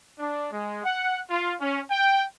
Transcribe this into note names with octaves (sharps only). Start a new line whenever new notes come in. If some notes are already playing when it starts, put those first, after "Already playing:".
D4
G#3
F#5
F4
C#4
G5